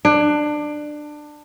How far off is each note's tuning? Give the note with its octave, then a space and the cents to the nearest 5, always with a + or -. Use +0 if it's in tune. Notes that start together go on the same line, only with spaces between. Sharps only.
D4 +20